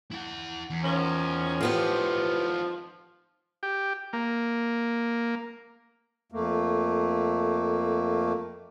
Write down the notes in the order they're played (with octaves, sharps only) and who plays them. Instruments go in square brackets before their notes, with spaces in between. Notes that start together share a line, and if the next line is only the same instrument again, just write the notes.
[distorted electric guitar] E4 F#5
E2
[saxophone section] D#3 F3 C#4
[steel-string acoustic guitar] A2 B3 G4 [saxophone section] F3 F4 [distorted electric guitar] C4 D#4
[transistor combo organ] G4
A#3
[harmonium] F2 A3 A#3